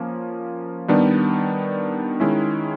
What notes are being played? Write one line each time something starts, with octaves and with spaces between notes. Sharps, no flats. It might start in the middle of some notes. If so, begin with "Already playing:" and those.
Already playing: F3 A#3 C#4
D#3 G3 B3 D4
D#3 G#3 C#4 E4